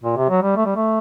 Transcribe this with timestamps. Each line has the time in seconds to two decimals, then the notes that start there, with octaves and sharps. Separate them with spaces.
0.04 A#2
0.17 C3
0.29 F#3
0.43 G3
0.57 A3
0.66 G3
0.76 A3